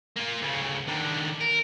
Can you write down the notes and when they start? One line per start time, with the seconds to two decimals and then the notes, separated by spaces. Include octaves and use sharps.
0.17 A#3 F4
0.42 D2 C#3
0.88 D#3 D4
1.41 A#4